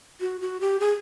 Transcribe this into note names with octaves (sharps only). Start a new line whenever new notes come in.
F#4
F#4
G4
G#4